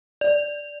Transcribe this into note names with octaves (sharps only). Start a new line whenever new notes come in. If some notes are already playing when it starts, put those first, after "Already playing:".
D5